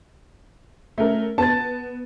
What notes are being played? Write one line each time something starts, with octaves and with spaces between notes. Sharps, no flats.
A3 C#4 A#4
B3 A5 A6